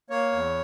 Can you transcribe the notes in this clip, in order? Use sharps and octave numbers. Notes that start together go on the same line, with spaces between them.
A#3 C#5
E2